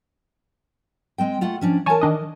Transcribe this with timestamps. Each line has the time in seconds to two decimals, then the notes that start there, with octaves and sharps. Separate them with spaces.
1.18 G#3 C4 G5
1.41 A3 F4 F#5
1.61 F3 C#4 D4
1.86 E3 A#4 C#5 G#5 A5
2.01 D#3 D4 D#5